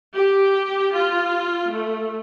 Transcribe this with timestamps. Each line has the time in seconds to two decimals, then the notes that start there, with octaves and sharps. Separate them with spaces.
0.15 G4
0.93 F4
1.70 A3